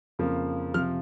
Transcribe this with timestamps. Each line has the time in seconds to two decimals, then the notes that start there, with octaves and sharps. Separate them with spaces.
0.19 F2 C#3 F3 A#3
0.74 C3 F3 F6